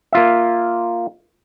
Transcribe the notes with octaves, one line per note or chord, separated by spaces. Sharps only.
A#3 F4 E5